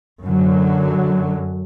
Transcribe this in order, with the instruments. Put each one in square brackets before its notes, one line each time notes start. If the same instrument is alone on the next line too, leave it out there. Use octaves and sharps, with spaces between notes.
[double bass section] F#2 D3 F#3